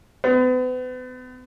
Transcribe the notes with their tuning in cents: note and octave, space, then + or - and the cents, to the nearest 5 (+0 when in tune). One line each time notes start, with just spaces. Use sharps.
B3 +40